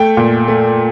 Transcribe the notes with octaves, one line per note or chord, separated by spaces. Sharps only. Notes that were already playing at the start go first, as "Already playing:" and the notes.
Already playing: A3 G5
A#2
A3